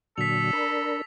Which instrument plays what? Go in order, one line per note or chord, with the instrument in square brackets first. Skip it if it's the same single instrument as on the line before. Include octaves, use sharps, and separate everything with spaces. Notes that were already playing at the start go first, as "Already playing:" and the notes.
[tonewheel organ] A#2 D3 F#3 [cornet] A4 [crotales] B6 F7
[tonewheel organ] D4 A#4 B5